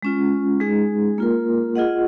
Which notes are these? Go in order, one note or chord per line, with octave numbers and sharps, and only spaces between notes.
G#3 C#4 F4
G#3 D#4 G#4
A#3 F4 A#4
F4 G#4 D#5 F#5